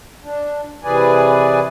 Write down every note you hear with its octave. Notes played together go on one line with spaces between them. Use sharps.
D4
C3 E3 G#4 B4 D5 G#5